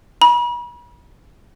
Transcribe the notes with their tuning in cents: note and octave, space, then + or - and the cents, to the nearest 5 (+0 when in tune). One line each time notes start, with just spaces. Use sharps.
B5 -40